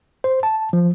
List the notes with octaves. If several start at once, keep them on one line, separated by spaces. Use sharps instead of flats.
C5
A5
F3